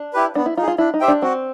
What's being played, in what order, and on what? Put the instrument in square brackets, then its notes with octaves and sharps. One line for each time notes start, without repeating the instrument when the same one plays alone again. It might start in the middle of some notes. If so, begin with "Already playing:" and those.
Already playing: [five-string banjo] D4
[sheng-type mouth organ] E4 G4 B4
[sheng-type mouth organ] B3 [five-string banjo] D4
[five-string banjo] E4
[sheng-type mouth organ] D#4 [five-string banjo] F4
[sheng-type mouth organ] G#4
[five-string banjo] F4
[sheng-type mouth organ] D4 [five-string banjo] E4
[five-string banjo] D#4
[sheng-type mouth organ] G4 C5 E5 G5
[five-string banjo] D4
[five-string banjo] C4 [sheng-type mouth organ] F#4